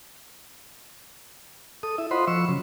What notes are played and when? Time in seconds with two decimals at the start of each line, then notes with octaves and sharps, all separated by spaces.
1.83 A4 D#6
1.98 E4 E5
2.11 F4 C5 D#5 F#5 B5 C6
2.27 F3 C#6 E6
2.49 C#3 F#3